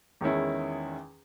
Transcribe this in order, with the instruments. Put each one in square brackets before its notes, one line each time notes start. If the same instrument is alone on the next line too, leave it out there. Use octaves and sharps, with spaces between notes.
[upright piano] E2 D#3 G#3 C#4 E4